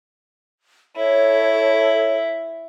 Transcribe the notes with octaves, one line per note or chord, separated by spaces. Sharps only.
E4 A4 C#5